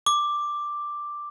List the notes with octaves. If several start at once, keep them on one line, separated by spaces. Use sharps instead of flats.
D6